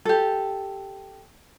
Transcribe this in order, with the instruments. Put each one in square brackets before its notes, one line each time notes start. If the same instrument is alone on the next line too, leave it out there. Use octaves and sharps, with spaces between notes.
[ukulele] G4 A4